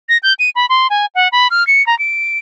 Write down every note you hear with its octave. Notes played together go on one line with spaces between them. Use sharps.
A#6
G6
D#7
B5
C6
G#5
F#5
B5
F6
C#7
A#5
D7